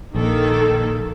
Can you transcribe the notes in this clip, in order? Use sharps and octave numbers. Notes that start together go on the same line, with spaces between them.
A#1 D#3 A#3 A4